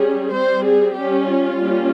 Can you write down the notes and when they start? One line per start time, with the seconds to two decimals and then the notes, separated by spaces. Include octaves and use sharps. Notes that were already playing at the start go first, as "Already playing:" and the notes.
Already playing: G3 C#4 G#4
0.33 G3 C4 C5
0.65 G#4
0.95 G3 C#4 G4
1.28 F4
1.59 G3 A#3 C#4